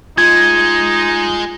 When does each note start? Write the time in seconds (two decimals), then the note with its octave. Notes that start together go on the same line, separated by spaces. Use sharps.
0.18 G#3 D#4 F4 G#6